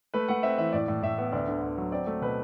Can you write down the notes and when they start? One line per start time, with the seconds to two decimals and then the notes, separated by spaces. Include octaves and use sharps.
0.14 A3 B4
0.28 A3 F#5
0.43 C4 E5
0.58 E3 E5
0.73 A2 D5
0.88 A2
1.02 A2 E5
1.18 B3
1.32 D2 D5
1.48 D3
1.62 D2
1.78 F#3
1.92 C4 D5
2.07 A3
2.21 B2 B4